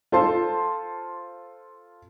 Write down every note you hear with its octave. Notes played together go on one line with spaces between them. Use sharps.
F4 A4 C5 A5 C6